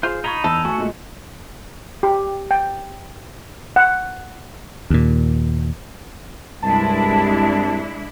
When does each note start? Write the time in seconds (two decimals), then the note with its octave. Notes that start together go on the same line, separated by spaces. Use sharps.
0.03 F4 G#4 C5
0.24 D#4 A#5 B5 C#6 G#6 G7
0.44 E2 A4
0.65 A3 F#4 G#5 C#6
0.78 A#2 G#3
2.03 G4
2.51 G5
3.76 F#5
4.90 D#2 A#2
6.62 C2 G2 G#3 D4 E4 A5